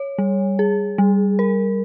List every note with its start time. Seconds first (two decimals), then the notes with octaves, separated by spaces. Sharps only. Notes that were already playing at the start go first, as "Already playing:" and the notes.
Already playing: C#5
0.18 G3
0.59 G#4
0.98 G3
1.39 A#4